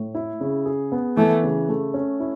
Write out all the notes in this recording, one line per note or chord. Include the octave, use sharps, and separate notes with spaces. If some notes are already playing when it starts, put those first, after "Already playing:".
Already playing: A2
E4
C#3
G#4
B3
E3 A3
C#3
A3
C#4
E4